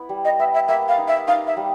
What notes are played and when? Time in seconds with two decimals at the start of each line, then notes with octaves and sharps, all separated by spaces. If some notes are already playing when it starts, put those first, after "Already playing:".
Already playing: B3 E4
0.09 G3
0.25 D#5
0.39 B3 E5
0.54 E5
0.68 A#3 E5
0.88 F5
0.98 D#4
1.08 E5
1.28 D#4 F5
1.47 E5
1.57 G3